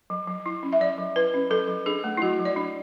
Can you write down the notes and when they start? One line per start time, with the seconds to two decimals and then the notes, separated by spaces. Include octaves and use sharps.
0.10 F#3
0.27 F#3
0.46 E4
0.63 C#4
0.73 E5
0.80 F#3 D5
0.98 F#3
1.16 E4 B4
1.34 C#4
1.50 F#3 A4
1.68 F#3
1.86 D4 G#4
2.04 A3
2.17 E4
2.22 F#3 F#4
2.40 F#3
2.45 D5
2.56 D4